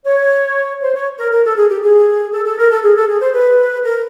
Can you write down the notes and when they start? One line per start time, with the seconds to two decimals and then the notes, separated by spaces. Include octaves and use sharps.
0.06 C#5
0.82 C5
0.95 C#5
1.19 A#4
1.32 A#4
1.45 A4
1.57 G#4
1.69 G4
1.82 G#4
2.33 A4
2.45 A4
2.58 A#4
2.70 A4
2.83 G#4
2.96 A4
3.07 G#4
3.20 C5
3.33 B4
3.83 A#4